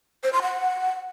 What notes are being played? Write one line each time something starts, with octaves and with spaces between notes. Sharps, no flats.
C5
C6
F#5